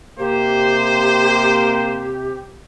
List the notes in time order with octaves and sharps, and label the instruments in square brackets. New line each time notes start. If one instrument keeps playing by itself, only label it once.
[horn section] C3 [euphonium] A#3 [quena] G4 [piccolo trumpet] C5